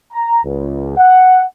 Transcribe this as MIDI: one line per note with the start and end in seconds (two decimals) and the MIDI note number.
0.13 0.43 82
0.44 0.97 37
0.97 1.43 78